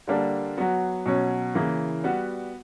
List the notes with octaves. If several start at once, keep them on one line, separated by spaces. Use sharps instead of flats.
D3 G3 A#3 D4
F#3 B3 F#4
B2 F#3 C#4
C#3 E3 A#3
G3 B3 F#4